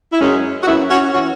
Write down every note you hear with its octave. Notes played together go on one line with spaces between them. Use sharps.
E4
F#2 F#3 G#3 C#4
F#4
F#2 F#3 B3 E4
C#4 F#4
E3 C#4 F#4